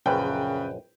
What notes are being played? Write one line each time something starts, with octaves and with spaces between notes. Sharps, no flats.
A#1 F#2 C#3 B4 G5